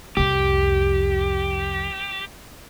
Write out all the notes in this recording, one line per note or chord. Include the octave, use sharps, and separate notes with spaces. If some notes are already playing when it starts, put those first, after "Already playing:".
C2 F2 G4